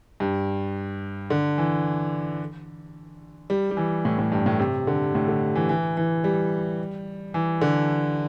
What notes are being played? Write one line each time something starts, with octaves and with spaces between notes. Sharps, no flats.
G2
D3
E3
G3
G3
E3
A2
A2
G2
A2
C3
D3
A2
D3
E3
E3
E3
G3
E3
D3